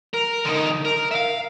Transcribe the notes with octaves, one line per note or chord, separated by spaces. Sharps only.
A#4
D3 D#4
A#4
E5 F5